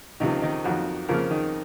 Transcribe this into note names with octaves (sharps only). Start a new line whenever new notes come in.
C#2 C3 D#3 F3 D#4
D#3 D#4
F2 D#3 F#3 F#4
F2 C#3 F3 A#3 A#4
D#3 D#4